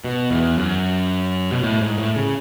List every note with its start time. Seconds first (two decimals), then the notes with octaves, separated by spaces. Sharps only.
0.04 B2
0.31 E2
0.58 F#2
1.52 B2
1.63 A2
1.81 G#2
1.98 A2
2.16 C#3